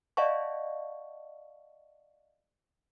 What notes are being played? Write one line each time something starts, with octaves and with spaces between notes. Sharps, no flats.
D5 D#5 F5 F#5 A5 C#6